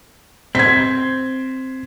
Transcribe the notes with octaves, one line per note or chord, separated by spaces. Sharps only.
C4 G#6 B6